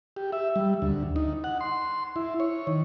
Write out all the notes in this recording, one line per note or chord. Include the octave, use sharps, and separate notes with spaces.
G4
E5
G3
D2
D#4
F#5
C6
E4
C#5
D#3